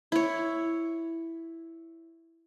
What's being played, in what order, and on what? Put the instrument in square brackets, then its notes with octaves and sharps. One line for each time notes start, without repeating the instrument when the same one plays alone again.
[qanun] E4 C#5